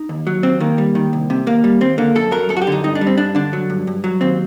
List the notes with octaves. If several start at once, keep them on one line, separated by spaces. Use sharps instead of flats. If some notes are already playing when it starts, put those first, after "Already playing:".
Already playing: D#4
D#2
F#3
D#2 C4
D#3 A#3
G3
D#3
C2
C3
D#2 A#3
G3
D#2 C4
D3 A#3
F#2 A4
F#3 A#4
F#2 A4
F#4
G4
D3 D#4
G2 D#4
D4
G3
C4
G2 D4
D3 D4
F#3
G2
G2
F#3
D#2 C4